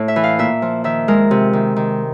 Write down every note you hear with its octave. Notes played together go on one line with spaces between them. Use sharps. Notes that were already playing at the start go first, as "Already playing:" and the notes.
Already playing: A2
E5
E3
F5
A#2 E5
F3
D#3 E5
G#3 A#4
C3
D#3
D#3